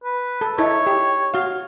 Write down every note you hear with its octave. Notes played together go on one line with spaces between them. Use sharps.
B4
A4
D#4 E4 A4 C#5
G4
F#4 F5